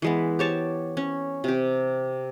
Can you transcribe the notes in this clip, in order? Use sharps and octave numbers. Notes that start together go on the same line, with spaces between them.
E3 G#3 B3
G4 C#5 A5
C#4
C3 G4